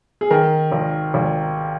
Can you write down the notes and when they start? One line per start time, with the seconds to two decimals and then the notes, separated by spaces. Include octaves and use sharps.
0.21 G#4
0.31 D#3 A#4
0.72 G#1
1.14 G#1